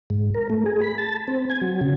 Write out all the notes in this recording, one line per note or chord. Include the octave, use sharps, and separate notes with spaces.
G#2
A#4
A3
G#4
B5
A5
C4
G#5
F#3
C#3